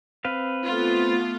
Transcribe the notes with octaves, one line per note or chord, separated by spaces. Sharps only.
C4 B4 F5
A3 B3 F4